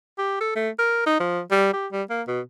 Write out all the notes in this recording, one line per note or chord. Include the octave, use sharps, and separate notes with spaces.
G4
A4
A3
A#4
D#4
F3
G3
G4
G3
A#3
B2